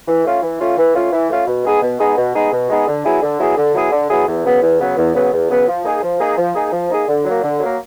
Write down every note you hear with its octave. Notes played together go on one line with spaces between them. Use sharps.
E3
A3 C#4 F4
E3
A3 C#4 F4
E3
A3 C#4 F4
E3
A3 C#4 F4
B2
G#3 B3 D#4 G#4
B2
G#3 B3 D#4 G#4
B2
G#3 B3 D#4 G#4
B2
G#3 B3 D#4 G#4
D3
F#3 B3 E4 G#4
D3
F#3 B3 E4 G#4
D3
F#3 B3 E4 G#4
D3
F#3 B3 E4 G#4
E2
C#3 F#3 B3
E2
C#3 F#3 B3
E2
C#3 F#3 B3
E2
C#3 F#3 B3
F3
A#3 D#4 G#4
F3
A#3 D#4 G#4
F3
A#3 D#4 G#4
F3
A#3 D#4 G#4
D3
F#3 A#3
D3
F#3 A#3